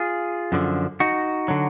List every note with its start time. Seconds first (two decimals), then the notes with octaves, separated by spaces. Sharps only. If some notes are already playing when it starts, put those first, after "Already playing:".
Already playing: F4 G#4
0.52 F#2 D3 F3
1.00 D#4 F#4
1.48 D3 F#3